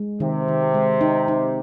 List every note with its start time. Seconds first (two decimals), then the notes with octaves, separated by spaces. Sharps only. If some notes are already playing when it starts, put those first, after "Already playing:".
Already playing: G#3
0.20 C3 D#3
0.48 D#3
0.74 G#3
1.01 D#4
1.28 D#4